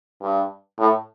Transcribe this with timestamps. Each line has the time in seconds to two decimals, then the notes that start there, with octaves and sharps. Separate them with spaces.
0.22 G2
0.79 A2